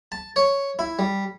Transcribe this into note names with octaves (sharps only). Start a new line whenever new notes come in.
A5
C#5
E4
G3